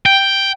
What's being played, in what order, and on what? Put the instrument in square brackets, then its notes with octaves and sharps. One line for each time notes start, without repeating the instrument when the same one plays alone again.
[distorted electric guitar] G5